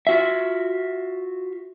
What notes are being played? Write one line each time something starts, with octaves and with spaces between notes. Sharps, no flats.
F4 F#4 E5